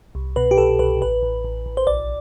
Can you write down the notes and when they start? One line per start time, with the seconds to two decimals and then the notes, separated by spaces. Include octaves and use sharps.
0.15 C2
0.36 B2 B4
0.51 G4
0.58 C2 A4
0.79 C2 B4
1.01 A1 B4
1.23 A1
1.44 A1
1.66 A1
1.77 C5
1.87 B1 D5